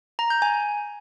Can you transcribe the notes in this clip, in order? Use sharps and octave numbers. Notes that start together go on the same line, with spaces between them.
A#5
G6
G#5